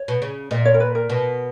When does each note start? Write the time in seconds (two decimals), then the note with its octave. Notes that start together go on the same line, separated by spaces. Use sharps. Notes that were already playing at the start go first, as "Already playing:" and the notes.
Already playing: C#5
0.08 B2
0.22 C#3
0.51 A#2 D#5
0.65 C#5
0.74 A#4
0.80 B4
0.95 A#4
1.09 B2